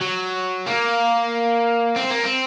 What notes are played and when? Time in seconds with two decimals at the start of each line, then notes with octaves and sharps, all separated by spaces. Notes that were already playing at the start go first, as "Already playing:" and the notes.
0.01 F#3
0.66 A#3
1.96 C4
2.10 A#3
2.23 C4